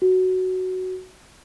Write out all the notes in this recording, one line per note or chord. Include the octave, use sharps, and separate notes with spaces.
F#4